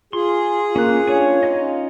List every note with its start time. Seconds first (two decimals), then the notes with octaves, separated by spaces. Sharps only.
0.13 F4 G#4 C6
0.76 A#3 C#4 F#6
1.07 C#4 D4 F4 C#5 G#5
1.43 C#4 D#4 D#5